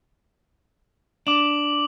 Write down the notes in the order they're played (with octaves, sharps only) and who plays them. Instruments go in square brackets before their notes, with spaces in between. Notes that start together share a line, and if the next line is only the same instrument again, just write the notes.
[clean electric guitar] D4 [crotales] D6 F#7